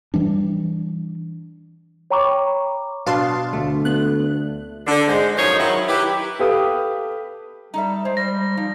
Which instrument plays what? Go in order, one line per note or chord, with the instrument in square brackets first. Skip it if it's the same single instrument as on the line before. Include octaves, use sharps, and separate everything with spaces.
[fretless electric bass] E3 G3 D4
[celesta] C#5 G5 A#5 B5 C#6 D6
[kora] B2 D4 [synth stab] F5 A5 C6
[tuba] D2 [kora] A3
[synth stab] B3 F#6
[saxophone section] D3
G#2 G#3 C5
F#2 D#3 F3 D#4 C5 C#5
D#3 F#3 E4
E4 G4 B4
[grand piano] G4 A4 B4 F5 D#6
[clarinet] G3 [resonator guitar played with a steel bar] D#4 A4 E5
[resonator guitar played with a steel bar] G#3 [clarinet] C5
[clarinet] G3 [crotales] A#6
[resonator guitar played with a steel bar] F3 [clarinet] D#4